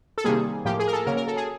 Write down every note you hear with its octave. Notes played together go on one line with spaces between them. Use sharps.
A4
C3 D#3 G3 A#3 G#4
A2 F3 A#3 G4
G#4
A#4
A4
C#3 F#3 A#3 C#4 A#4
A#4
A4
G#4